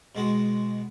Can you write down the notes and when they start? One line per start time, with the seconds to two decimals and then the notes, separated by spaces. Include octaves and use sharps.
0.15 B2 G#3 F#4